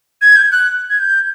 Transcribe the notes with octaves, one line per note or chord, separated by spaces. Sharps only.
G#6
G6
F#6
G#6
G6